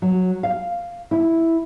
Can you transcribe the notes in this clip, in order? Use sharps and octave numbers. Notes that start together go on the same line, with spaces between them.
F#3
F5
E4